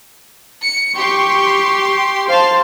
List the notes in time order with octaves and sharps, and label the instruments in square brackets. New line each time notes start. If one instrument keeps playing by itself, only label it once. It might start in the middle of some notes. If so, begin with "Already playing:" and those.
[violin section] C#7
[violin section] G4 C6 [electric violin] C#6
[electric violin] C5 C6 [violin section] F5 A5